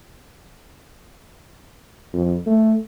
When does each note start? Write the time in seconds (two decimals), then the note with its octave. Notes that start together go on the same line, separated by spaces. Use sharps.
2.14 F2
2.46 A3